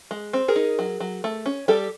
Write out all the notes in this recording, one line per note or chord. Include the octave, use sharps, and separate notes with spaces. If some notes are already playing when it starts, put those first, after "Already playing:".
G#3
C4
G#4 A#4
D#4
F#3
F#3
A3
C#4
G3 G4 A4